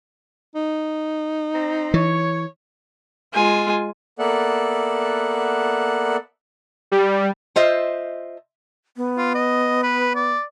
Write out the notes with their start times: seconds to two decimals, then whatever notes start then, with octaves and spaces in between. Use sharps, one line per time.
0.55 D#4
1.53 C4 A#5
1.94 E3 C#5
3.34 G#3 F4 G#5
4.19 A#3 B3 A4 D5 E5 F#5
6.92 G3
7.56 F4 C5 D#5 E5
8.97 B3
9.18 F4
9.35 D#5
9.83 B4
10.15 D5